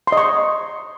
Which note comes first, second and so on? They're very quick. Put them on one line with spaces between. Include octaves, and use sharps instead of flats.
C6 D#5 C#6